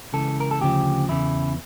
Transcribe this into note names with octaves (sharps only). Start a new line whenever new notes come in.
C#2 C#3 E3 A4
A#4
A4
D2 C#3 F3 G4
E2 C#3 E3 E4